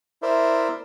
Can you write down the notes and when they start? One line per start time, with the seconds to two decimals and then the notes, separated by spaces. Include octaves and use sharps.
0.22 E4 A#4 C5 D5 E5